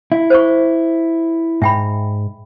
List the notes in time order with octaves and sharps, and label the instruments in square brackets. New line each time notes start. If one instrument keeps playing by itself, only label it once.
[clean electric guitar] E4
[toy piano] C5 C#6
[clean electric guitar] G#2 [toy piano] E5 G5 B5